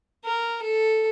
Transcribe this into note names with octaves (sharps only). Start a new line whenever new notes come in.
A#4
A4